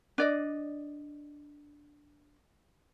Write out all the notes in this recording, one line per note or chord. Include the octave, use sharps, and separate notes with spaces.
D4 D5 D#5